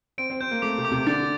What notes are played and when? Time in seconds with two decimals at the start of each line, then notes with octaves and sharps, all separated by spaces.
0.18 C4 D7
0.30 C4
0.41 C4 G6
0.51 A#3
0.62 A3 D6
0.78 C3
0.85 D6
0.92 C3
1.07 D3 A6